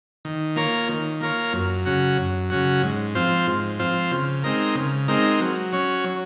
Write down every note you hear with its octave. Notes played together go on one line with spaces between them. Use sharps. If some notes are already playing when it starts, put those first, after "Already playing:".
D#3
A#3 F4 A#4 C#5
D#3
A#3 F4 A#4 C#5
F#2
C#3 F#3 C#4 F#4
F#2
C#3 F#3 C#4 F#4
G#2
F3 C4 F4 C5
G#2
F3 C4 F4 C5
C#3
G#3 C4 D#4 A#4
C#3
G#3 C4 D#4 A#4
F#3
C#4 F#4 C#5
F#3